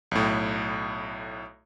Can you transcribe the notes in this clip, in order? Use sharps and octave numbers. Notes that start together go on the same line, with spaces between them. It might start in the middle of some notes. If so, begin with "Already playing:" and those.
B1 A2